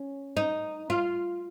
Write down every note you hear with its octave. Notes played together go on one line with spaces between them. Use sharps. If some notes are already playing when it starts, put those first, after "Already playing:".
Already playing: C#4
D#4
F4